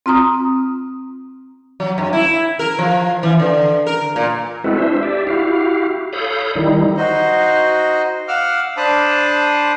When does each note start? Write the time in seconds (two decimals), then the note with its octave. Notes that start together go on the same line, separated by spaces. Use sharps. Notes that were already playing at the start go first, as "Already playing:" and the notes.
0.06 C4 F4 A#5 D#6
1.80 F#3
1.98 G2
2.13 E4
2.59 A#4
2.79 F3
3.23 E3
3.39 D3
3.87 A#4
4.16 A#2
4.64 G#3 C4 E4 F#4 A4 B4
4.77 D4 E4 C5 E5
5.03 G4 D5 E5
5.27 E4 F#4 G4 F5
6.13 A4 C#5 F5 B5 D#6 G6
6.55 D#3 G3 D#4 E4
6.96 D#4 F#4 C5 D#5
8.28 F5 F#5 D6 E6 F6
8.77 D4 C5 A5 B5 D6 D#6